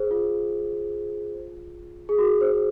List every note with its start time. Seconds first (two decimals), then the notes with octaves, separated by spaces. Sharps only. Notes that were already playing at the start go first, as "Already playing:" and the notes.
Already playing: G#4 C5
0.11 F4
2.09 G#4
2.18 F#4
2.41 C5